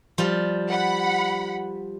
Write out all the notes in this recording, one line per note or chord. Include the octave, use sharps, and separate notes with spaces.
F3 G3 F4
F#5 B5